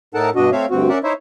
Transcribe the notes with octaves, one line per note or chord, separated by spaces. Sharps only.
A2 D#4 A4 A#4 F#5 A5
G2 B2 D4 F#4 D#5
A3 C4 C#5 E5 F5
D2 G2 C4 F#4
C#4 A#4 D5 E5 F#5
D#4 E4 C5 C#5 E5